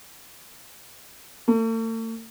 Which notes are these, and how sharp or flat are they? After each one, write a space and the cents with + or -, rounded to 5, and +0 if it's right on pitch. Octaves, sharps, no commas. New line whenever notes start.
A3 +45